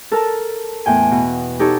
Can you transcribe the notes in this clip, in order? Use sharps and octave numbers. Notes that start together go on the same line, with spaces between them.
A4 A#4 A5
E2 A2 G5 G#5
B2
D#4 G4 A4 C#5